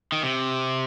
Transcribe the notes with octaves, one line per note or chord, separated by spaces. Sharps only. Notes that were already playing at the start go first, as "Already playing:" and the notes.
D#3
C3